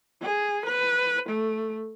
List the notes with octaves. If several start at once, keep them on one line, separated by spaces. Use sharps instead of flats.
G#4
B4
A3